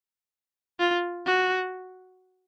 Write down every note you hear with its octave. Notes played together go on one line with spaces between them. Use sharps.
F4
F#4